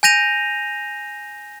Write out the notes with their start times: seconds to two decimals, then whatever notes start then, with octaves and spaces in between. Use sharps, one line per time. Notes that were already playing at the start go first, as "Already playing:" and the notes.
0.03 G#5 G6 A#6 D#7 F7